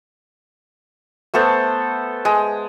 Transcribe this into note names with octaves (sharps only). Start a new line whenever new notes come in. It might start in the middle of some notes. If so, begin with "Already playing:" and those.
A3 B3 A4 C5
G#3